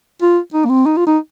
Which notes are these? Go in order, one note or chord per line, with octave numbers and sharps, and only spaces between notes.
F4
D#4
A#3
C4
D#4
F4
D#4